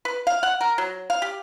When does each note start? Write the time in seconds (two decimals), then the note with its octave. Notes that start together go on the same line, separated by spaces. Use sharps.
0.05 B4
0.27 F5
0.43 F#5
0.61 A#4
0.78 F#3
1.10 F5
1.22 G4